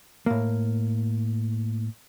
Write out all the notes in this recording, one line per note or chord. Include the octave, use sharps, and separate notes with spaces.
A2 A#3